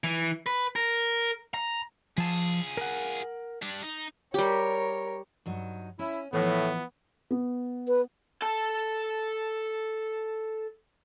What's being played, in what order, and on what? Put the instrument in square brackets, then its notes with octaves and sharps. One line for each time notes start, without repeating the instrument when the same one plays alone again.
[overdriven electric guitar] E3
B4
A#4
A#5
[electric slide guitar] F3 A5 [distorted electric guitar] F4 G#4
[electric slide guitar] A#4 F#5
[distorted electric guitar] G3 D4
D#4
[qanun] G3 G4 [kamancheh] A#4 C#5
[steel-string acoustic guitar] G2 F#3 D#4
[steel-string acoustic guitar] C#4 [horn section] E4
[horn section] A2 [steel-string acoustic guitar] E3 F3 [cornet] B3
[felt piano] B3
[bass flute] B4
[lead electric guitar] A4 A5